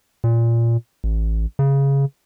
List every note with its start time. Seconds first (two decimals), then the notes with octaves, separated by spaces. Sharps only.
0.24 A#2
1.04 A1
1.59 C#3